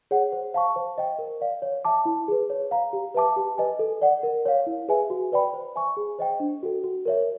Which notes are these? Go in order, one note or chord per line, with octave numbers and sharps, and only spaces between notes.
G#4 C#5 F#5
C5
F5 A5 C#6
C5
D#5 G5
A#4
D5 F5
C#5
E5 A5 D6
E4
G#4 B4
C#5
F5 A#5
G4
B4 E5 A5 D6
G4
B4 D#5 G#5
A4
D5 F#5
A#4
C#5 F5
E4
G#4 B4 E5 G#5
F#4
B4 D5 G5 B5
C5
E5 G#5 C#6
G#4
C5 D#5 G5
D4
F#4 A4
F#4
A#4 C#5 E5